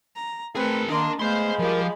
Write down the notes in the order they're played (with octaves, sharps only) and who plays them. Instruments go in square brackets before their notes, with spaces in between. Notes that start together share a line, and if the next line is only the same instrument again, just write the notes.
[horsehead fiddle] A#5
[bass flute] A3 [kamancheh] C4 [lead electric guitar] G#4 A#4 [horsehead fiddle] B4
[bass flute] D#3 [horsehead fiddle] A#3 D#5 [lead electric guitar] D4 [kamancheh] A#4 C6
[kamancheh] G#3 B5 [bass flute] A3 [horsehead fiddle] B3 F5 [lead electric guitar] C5 C6
[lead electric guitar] F3 F4 [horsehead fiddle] G3 G4 [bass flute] A#4